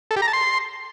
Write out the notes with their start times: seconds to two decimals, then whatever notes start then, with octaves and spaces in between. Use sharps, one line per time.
0.11 A4
0.16 G4
0.22 A#5
0.28 A5
0.33 C6